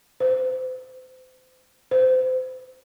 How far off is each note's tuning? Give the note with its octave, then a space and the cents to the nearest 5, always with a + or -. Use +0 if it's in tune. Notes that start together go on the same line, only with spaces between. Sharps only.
C5 -35
C5 -30